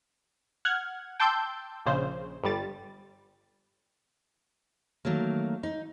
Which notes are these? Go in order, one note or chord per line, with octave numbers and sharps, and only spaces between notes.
F#5 F6 G#6
G5 A5 C6 D6 E6 G6
A#1 C#3 C5
G1 G3 A6
D#3 F#3 A3 A#3
D#4